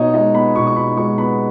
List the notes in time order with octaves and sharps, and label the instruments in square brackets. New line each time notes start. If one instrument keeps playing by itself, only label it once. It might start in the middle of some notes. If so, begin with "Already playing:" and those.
Already playing: [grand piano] B2 B3 D#4 C#5 D#5
G#3 D#5
B3 B5
B2 C#6
C#6
D#4 B5
G#3 C#6
B3 B5